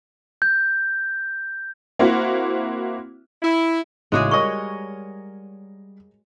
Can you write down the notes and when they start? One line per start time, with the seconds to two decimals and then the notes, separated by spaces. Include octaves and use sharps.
0.42 G6
1.99 A#3 C4 E4 F#4
3.43 E4
4.12 A1 C#3 G#3 D#4 E4 F#4 G#4 D6
4.31 G3 A#4 C#5 D#5 C#6